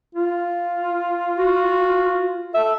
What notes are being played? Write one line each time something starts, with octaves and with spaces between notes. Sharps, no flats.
F4
F#4
A4 E5